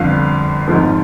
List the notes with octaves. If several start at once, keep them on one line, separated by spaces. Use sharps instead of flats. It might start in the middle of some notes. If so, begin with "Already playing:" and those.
Already playing: G1 F2 D3 F3 F5
G#1 G#2 F3